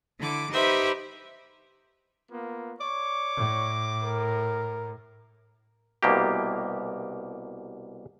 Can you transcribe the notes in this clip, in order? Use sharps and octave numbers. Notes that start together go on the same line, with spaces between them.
D3 E4 D6
D#4 G4 B4 C5 E5 B5
A#3 B3 F4
C#5 D5 C#6 D6
A2
A#4
C2 B2 A#3 G4